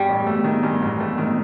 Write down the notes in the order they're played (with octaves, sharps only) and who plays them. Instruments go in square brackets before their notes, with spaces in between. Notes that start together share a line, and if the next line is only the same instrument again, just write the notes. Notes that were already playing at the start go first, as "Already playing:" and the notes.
Already playing: [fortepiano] G2 [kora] G3
[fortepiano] A1
A3
D#3
G2
A1
A3
D#3